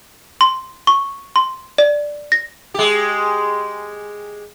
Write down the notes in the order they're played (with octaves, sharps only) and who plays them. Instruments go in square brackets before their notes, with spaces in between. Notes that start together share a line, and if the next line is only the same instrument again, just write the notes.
[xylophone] C6
C#6
C6
D5
A#6
[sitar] G#3 G4